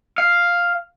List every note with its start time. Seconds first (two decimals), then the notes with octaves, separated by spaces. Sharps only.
0.18 F5